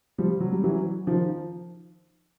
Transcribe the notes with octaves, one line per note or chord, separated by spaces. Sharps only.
F3 G3
F#3
G3
E3 F#3
D#3 F3